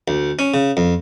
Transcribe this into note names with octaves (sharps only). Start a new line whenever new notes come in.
D2
C#4
C#3
F2